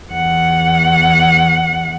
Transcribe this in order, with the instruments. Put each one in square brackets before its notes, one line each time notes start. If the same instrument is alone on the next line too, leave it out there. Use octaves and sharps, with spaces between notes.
[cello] E2 F#5